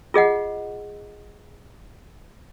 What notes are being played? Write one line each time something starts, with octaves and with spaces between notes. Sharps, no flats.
F4 G#4 D#5 F#5